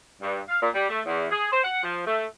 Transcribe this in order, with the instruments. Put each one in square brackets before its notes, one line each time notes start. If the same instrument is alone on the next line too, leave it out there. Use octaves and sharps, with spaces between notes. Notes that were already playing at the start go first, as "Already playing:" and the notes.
[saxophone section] G2
F5
A#2
G3
A3
E2
G#4
C5
F#5
F3
A3